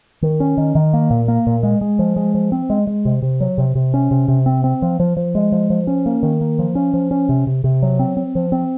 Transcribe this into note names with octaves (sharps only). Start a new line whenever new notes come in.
D#3
C#4
D#3
D#3
A#3
A#2
A#3
A#2
G#3
G#3
F3
G#3
F3
C4
G#3
G#3
C3
C3
F#3
C3
C3
C#4
C3
C3
C4
C4
F3
F3
F3
G#3
F3
F3
C#4
A#3
D#3
A#3
F3
C#4
F3
C#4
C3
C3
C3
F#3
C4
C4
F3
C4